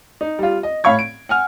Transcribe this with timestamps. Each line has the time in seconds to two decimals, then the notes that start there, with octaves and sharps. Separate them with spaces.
0.21 D#4
0.39 G3 F4
0.63 D#5
0.84 A2 C#5 F5 B5 C#6 G#6
0.99 D7
1.29 F#5 G#5 F6